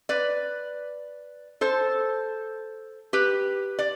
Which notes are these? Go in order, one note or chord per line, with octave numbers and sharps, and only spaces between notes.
B4 D5
A4 C5
G4 B4
D5